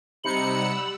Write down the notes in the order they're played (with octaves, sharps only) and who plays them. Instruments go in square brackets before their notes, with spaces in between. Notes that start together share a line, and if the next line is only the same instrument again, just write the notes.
[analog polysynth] C3 D#4 C#7 [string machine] G3 F#5 E6 [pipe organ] B5